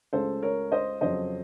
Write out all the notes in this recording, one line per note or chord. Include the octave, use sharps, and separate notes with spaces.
C#2 C#3 A3 A4 C5
A#4 C#5
C5 D#5
F2 C#3 F#3 C5 D#5